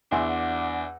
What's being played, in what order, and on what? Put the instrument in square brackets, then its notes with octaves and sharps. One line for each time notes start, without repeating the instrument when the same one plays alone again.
[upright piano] E2 [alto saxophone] D4 [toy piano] E5 G#5 C6 [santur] F#5 E6